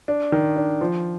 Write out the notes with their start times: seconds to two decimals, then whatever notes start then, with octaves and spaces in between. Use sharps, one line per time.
0.08 D4
0.32 D#3
0.56 D4
0.81 F3